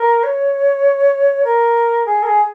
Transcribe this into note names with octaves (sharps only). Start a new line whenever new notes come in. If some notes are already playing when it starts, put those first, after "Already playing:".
Already playing: A#4
C#5
A#4
G#4
A#4
G#4